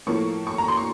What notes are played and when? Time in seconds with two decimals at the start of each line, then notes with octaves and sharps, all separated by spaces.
0.07 A2 F3 A#3 C#6
0.47 C#6
0.58 A#5
0.68 C6
0.77 C#6